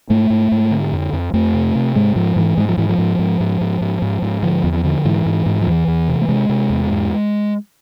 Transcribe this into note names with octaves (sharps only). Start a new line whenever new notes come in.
G#2 A3
G#2
G#2
D3
F2
F2
F2 A3
C3
C3
G#2 G#3
G#2 F3
G#2 E3
G#2 G#3
F3
G#2 E3
F3
G#2
G#2
G#2
G#2
G#2
G#2
G#2
D3 F3
E2
D3
G#2 E3
G#2
G#2
F3
E2 E3
E2
C3
A3
C3 G#3
C3
E2
G#2